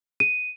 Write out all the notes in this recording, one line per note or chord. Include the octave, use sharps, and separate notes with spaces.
D#7